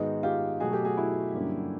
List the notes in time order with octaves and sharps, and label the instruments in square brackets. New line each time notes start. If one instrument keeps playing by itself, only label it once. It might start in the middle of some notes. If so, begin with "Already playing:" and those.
Already playing: [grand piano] G#2 D#3 G#3 B3 D#4 [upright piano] F#4
[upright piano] F4 G4
[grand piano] B2 F#3 A3 [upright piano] F#4 G#4
[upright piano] G4 A4
F#4 G#4
E4 F#4
[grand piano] G2 D3 F#3 A#3 C#4